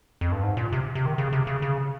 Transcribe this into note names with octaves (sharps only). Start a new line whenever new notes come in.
F2
G2
G#2
A#2
C3
C3
D#3
C#3
C3
C#3
C#3